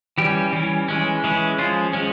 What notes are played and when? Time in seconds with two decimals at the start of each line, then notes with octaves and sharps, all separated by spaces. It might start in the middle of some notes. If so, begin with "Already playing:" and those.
0.18 E3 G3 C#4 G4
0.53 E3 G3 C#4
0.88 E3 G#3 C#4
1.24 E3 G#3 C#4
1.59 F3 G#3 C#4 F4
1.93 F3 G#3 C#4